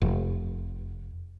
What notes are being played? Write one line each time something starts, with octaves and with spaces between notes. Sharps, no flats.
F1